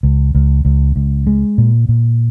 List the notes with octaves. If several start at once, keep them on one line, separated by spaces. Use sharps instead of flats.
C#2
C#2
C#2
C#2
G#3
A#2
A#2